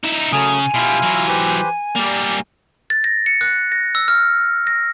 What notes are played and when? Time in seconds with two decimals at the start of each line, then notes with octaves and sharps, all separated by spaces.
0.04 D#4 E4
0.33 C#3 F#3 A3 G#5 D#6
0.74 B2 G3 E4 F4 F5
1.02 E3 F#3
1.28 G4 B4 C5
1.95 G3 A#3 D5
2.90 A6
3.04 A#6
3.26 C#7
3.41 F#6
3.72 A#6
3.95 E6
4.08 F6
4.67 A#6